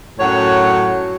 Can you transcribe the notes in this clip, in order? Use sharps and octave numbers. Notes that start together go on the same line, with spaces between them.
F#2 A2 F#3 F#4 C#5